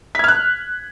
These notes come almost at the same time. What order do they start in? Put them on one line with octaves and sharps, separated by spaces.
B6 G#6 F6 F#6